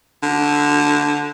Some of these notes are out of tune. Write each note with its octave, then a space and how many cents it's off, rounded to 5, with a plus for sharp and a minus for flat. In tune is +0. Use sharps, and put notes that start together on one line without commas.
D3 -5